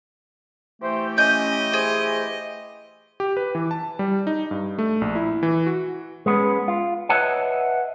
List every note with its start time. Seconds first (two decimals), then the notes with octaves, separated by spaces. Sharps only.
0.82 E3 A3 G4 C5
1.18 C#4 D#5 G6
1.73 G#4 C5
3.20 G4
3.37 B4
3.55 E3
3.71 A5
3.99 G3
4.27 D#4
4.51 G2
4.79 A3
5.01 A#1
5.15 E4
5.43 E3
5.67 F#4
6.26 G#3 B3 C#4
6.68 F4
7.09 B4 C#5 D#5 E5 F#5 A5